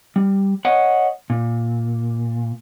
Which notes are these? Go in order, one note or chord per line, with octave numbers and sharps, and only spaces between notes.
G3
C#5 D#5 F#5
A#2